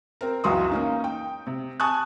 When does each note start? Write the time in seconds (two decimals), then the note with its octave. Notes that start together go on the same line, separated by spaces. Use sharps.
0.21 C4 A#4
0.44 C#2 F#2 E3 F#4 C6 D#6
0.71 A#3 C#4 D#4
1.04 G5
1.47 C3
1.80 G#5 A5 C#6 D#6 F#6